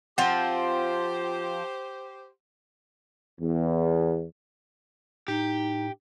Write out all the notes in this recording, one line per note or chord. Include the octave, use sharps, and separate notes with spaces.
F3 C4 G4 C5 F#5
E2
A2 D#4 G4